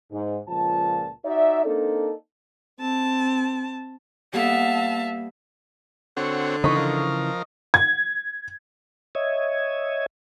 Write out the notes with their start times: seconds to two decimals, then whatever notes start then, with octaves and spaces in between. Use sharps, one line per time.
0.12 G#2
0.48 C#2 A#2 F3 A5
1.25 D#4 F#4 D5 E5
1.65 A#3 C4 D4 D#4 A4
2.80 C4 A5
4.34 G3 A#3 B3 A4 E5 F5 A5
6.17 D3 C4 F#4 C#5
6.64 C#3 E3 D#4 B4 D#5 C#6
6.76 F3 A#4
7.74 G#6
9.15 C#5 D#5 E5 G#6